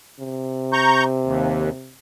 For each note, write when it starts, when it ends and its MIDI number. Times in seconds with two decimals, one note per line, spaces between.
0.20 1.95 48
0.73 1.04 82
0.73 1.04 85
0.73 1.04 91
1.24 1.70 39